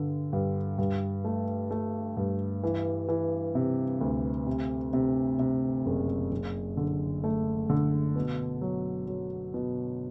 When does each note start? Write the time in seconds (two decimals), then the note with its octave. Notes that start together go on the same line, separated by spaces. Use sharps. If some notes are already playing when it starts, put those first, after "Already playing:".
Already playing: G2 D3
0.33 G2
0.78 G2
1.24 A3
1.71 A3
2.17 G2
2.63 E3
3.08 E3
3.55 C3
4.01 D2
4.47 C3
4.93 C3
5.39 C3
5.86 F#1
6.32 F#1
6.77 D3
7.24 A3
7.70 D3
8.16 B2
8.61 F#3
9.08 F#3
9.54 B2